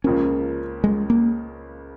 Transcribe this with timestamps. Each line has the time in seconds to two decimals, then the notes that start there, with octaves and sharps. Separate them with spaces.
0.04 C#2 C#3 F3 A#3 C#4
0.84 G#3
1.10 A#3